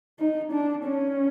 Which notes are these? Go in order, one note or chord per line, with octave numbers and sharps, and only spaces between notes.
D#4
D4
C#4